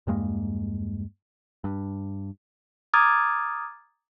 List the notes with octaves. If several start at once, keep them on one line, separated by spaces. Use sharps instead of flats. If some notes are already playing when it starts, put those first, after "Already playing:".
E2 G2 G#3 A#3
G2
A#5 D6 D#6 F6 G#6 A6